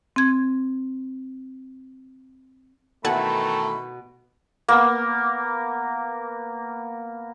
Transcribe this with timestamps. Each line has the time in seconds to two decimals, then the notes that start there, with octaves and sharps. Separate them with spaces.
0.16 C4 G#6
3.05 B2 D#3 E3 A3 A4 F#5 G#5 B5
4.68 A#3 B3